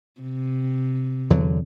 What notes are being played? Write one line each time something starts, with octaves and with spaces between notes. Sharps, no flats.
C3
E2 D3 F#3